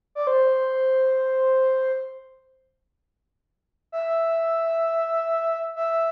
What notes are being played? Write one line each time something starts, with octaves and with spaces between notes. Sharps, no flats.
D5
C5
E5
E5